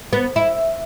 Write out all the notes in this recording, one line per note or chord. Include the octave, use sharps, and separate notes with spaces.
B3
E4